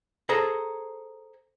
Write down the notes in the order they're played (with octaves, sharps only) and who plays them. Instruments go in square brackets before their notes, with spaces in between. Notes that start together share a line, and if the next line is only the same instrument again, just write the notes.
[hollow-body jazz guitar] G#4 A4 C5 A#5